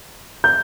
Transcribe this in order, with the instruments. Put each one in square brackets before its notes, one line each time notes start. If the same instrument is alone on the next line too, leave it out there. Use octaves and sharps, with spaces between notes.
[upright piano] G6